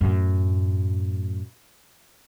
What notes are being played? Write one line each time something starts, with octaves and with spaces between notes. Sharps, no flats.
F#2 A2